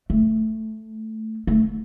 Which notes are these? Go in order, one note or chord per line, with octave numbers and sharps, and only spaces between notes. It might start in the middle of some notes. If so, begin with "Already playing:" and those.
A3
A3